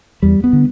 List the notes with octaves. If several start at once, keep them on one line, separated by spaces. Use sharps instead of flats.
E2 G3
B3
D3